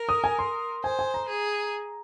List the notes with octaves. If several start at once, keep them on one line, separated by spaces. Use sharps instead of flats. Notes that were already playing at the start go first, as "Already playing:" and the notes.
Already playing: A#4
D#6
G#5
C6
C5 G#5
G#5
A#5
G#4